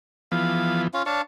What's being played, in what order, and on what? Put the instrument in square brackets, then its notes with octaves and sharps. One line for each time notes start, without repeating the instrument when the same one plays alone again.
[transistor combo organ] E3 F3 B3 [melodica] F5
[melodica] C#4 F4 F5
[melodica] D4 F5 A5 [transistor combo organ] C#5